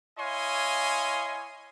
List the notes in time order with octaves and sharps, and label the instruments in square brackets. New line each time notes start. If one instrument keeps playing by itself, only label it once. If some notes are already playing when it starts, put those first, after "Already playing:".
[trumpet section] E4 C#5 D#5 F5 G#5 C6